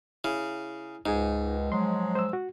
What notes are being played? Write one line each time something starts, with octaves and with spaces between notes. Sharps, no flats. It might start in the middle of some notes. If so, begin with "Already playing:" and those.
C#3 E4
C#2 G#2 D#4 G#4
F3 F#3 G#3 C6
C5 E6
F#4